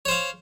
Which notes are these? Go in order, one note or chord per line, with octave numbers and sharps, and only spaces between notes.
C5 C#5 F5